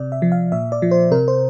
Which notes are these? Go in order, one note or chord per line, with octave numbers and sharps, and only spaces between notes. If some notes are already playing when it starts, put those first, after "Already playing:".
Already playing: C3 D5
E5
F3
F5
A#2 E5
D5
F3
C5
C3 A#4
C5